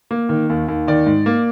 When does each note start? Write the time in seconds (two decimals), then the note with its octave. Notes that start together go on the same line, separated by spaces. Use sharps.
0.11 A#3
0.29 D#3
0.50 D#2
0.68 D#2
0.87 D#3 D5
1.06 G#2
1.26 A#3